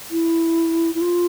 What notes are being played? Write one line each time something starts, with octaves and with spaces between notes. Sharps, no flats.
E4
E4
F4